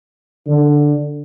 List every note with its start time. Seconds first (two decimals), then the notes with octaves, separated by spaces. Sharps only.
0.47 D3